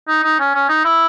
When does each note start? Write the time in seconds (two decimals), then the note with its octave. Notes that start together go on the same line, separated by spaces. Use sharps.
0.08 D#4
0.24 D#4
0.40 C#4
0.55 C#4
0.69 D#4
0.85 E4